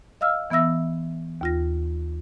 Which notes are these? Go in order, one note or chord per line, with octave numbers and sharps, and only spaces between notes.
D#5 F5 E6 F6
E3 B3 E5 E6 A#6
D#2 F4 A#6